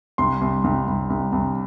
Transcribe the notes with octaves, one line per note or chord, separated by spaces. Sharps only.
C2 C6
C2
C2
C2
C2
C2